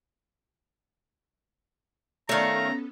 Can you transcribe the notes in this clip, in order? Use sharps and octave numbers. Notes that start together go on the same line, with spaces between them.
D#3 A3 B3 C#4 A4 C#5 F5 A#5